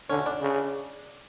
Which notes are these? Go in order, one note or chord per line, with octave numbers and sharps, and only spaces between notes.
D3 C#4
D4
C#3